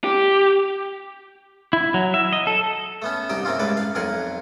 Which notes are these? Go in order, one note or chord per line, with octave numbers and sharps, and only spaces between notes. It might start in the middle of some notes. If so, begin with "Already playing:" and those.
G4
E4
F#3
E5
D#5
A4
A3 B3 C#4
C2 D#4 G4 G5
C3 A#3 C4 C#4 F4
C#2 A2 A4 B4 D6
F5
B1 F2 A#4 F#5 G#5